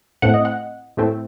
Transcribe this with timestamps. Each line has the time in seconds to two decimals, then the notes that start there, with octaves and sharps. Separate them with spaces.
0.22 A2 A3 C4 F#5
0.34 D#5
0.45 F#5
0.97 A2 A3 C4